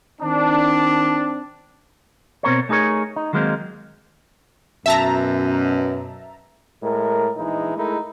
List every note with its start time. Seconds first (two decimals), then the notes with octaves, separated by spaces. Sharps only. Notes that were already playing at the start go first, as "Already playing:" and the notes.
0.22 D#3 C4 D4
2.43 B2 C4 A#4 C#5
2.69 A3 D#4 G#4 A#4 C#5
3.16 D#4
3.33 D#3 F#3 G#3 A#3 C4 D#4
4.86 F#2 B2 E5 A5 A#5
6.83 A2 G#3 A#4
7.36 A#1 E3 G#3 D#4 E4
7.77 G#3 A3 D#4 E4 A#4